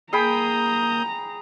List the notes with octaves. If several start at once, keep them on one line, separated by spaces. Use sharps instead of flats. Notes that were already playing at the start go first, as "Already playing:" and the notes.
A#3 G#4 G5 A#5 B5 D#6 G6